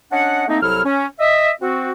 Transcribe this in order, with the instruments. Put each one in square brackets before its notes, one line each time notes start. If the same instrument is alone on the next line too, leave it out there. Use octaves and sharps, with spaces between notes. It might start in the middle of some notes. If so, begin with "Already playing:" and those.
[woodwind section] C#4 D4 D#5 F#5
A3 A#3 C4 D#4
C2 F#3 E4 A4 F6
C#4
D#5 E5
C4 F#4